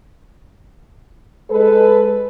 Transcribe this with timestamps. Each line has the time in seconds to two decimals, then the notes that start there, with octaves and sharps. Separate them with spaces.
1.51 G#3 A4 B4